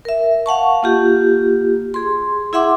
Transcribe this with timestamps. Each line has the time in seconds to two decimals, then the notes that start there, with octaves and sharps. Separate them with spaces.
0.05 A#4 E5
0.46 F5 F#5 A5 C#6
0.83 A#3 F4 G4
1.94 G#4 C6
2.53 E4 G#4 E5 F#5 C6 D6